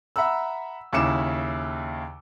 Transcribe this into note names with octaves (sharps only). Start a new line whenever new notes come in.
E5 F#5 A#5 B5 E6
D#2 C#3 E4 D6 C#7 E7